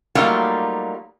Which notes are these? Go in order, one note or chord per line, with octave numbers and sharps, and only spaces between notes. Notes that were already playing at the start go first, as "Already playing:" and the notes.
F#3 G3 A3 A#3 D#4 F4